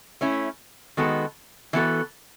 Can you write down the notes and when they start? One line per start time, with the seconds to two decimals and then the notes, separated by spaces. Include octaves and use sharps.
0.21 A3 C#4 E4
0.97 D#3 G#3 B3 F#4 A4
1.73 E3 B3 F#4 A4